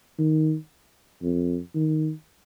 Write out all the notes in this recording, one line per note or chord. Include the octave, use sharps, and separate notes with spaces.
D#3
F2
D#3